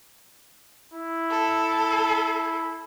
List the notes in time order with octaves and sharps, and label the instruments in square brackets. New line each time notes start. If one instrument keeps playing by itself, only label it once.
[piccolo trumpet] E4
[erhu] A4